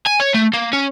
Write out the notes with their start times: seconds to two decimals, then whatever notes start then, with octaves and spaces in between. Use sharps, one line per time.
0.06 G#5
0.20 C#5
0.34 A3
0.54 A#3
0.73 C#4